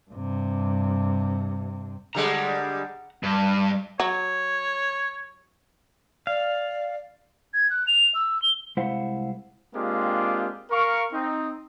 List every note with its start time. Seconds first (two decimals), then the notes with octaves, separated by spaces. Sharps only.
0.11 G2 C3
2.15 D3 G3 G#3 F#5 A#5
3.23 G2
4.00 F#3 C#5
6.27 D5 F5
7.54 G#6
7.70 F#6
7.87 F7
8.15 E6
8.42 G7
8.77 C2 G#3 E4 C5 F5 F#5
9.75 G#3 A#3 C4 D4 F4 G4
10.71 A#4 F5 C#6
11.13 C4 D#4